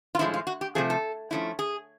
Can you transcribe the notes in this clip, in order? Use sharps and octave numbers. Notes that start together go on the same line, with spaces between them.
F4
A2 F3 G#3 E4
F4
F#4
G4
C3 F3 A3 G#4
A4
F3 A3 C#4 E4
G#4